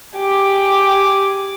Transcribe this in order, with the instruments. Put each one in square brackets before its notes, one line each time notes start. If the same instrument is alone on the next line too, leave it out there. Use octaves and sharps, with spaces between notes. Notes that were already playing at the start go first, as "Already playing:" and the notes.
[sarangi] G4 [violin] G#4 D6